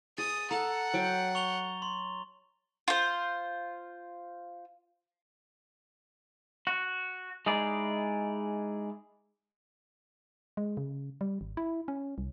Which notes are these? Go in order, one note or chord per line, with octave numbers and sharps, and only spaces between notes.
G#4 D#6 A6
A4 F#5 A#5
F#3 G5 A5
C#6 F7 G7
C6
F4 C5
F#4
G#3 D#4 E4 G#4 D5
G#3
C#3
G3
G#1
E4
C#4
C2